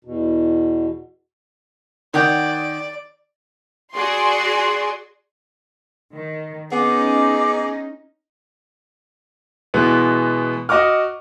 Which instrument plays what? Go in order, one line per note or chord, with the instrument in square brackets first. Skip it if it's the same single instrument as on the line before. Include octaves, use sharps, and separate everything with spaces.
[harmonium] E2 B2
[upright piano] D#3 [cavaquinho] C#5 F#5 G5 [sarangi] D5
[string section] F#4 G#4 D5 C6
[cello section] D#3
[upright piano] B3 [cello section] C#4 D#4 [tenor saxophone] G#4 [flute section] D6
[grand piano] B2 E3 G#3 B3
F#4 D#5 C#6 D6 F6